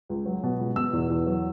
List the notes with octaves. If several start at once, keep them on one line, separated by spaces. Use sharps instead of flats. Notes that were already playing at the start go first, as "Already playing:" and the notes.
C#2
F#3
B2
C#2
B2 E6
E2
E2
F#3